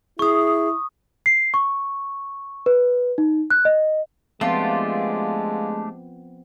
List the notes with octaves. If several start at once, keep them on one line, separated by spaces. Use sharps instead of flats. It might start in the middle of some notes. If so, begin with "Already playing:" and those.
E4 G#4 C#6 D#6
C7
C#6
B4
D#4
F#6
D#5
F3 G#3 A3 B3 C4 D4 F4 G4